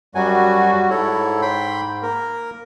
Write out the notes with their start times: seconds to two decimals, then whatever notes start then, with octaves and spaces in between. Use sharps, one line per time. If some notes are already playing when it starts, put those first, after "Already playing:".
0.15 F#2 F#3 G3 F#4 G#5
0.90 G#2 E4 A4 C#5
1.42 G5 B5 C6
2.03 A#3 A#4